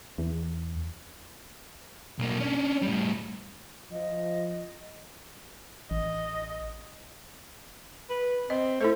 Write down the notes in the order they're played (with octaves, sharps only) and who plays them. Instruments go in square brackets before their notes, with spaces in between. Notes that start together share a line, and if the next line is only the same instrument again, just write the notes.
[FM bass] E2
[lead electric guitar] B1 A#3
C#4 D4
A2 G3
[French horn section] F3 [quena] D#5
[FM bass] A1 [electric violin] D#5
[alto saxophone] B4
[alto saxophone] C4 [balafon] D#5
[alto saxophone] A3 [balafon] E4 A4 C5